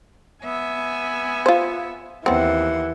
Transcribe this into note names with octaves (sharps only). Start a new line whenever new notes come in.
B3 E5 G#5
F4 C5
D#2 E3 B3 C4 F#5